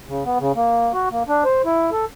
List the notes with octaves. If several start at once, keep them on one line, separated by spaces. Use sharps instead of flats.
C#3
B3
C#3
A#3
F#4
A#3
D4
C5
E4
A4